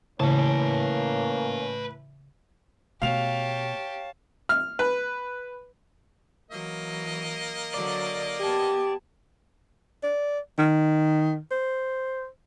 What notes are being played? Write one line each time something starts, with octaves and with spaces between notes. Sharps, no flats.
A2 C#3 E3 A#3 C#4 B4 A5
B2 A3 G4 C#5 F5 A5 F7
F6
B4
E3 F#3 A#3 D#5
D3 F#3 D5
B3 G4 A5 G#6
D5
D#3
C5